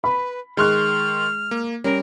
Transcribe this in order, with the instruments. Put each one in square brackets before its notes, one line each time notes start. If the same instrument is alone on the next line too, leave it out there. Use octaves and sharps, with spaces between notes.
[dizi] B4 [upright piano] B5
[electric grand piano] D#3 C6 C#6 [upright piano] G#3 F#6 [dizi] F6
[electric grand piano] A#3
[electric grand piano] G3 [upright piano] C#4 [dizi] A#4